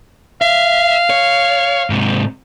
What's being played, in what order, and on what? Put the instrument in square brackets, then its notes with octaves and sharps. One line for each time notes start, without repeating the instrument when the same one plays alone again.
[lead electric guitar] E5 [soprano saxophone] F5
[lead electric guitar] C#5
G#2 C3